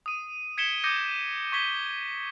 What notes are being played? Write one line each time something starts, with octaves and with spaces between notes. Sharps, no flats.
D#6 D#7
G#6 B6 C#7 D7 E7 G7
D6 D#6 G6 A#6 C#7 D#7
C#6 G#6 B6 G7